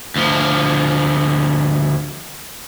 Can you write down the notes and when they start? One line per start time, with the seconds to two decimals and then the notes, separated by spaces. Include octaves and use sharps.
0.16 D2 F3